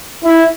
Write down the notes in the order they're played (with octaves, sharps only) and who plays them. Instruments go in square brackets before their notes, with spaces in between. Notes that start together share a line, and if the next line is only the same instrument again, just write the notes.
[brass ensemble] E4